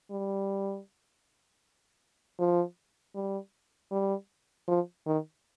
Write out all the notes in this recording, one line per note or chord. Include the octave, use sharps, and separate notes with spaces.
G3
F3
G3
G3
F3
D#3